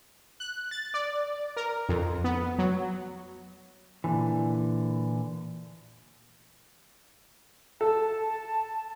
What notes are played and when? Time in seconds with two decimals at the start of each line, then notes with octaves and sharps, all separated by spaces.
0.40 F#6
0.71 A6
0.94 D5
1.57 A#4
1.89 F2
2.24 B3
2.58 F#3
4.04 A#2 D3 E3
7.81 A4 A5